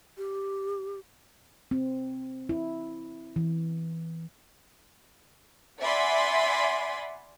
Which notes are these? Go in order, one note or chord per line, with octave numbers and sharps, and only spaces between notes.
G4
C4
E4
E3
D5 E5 F#5 G#5 B5 C6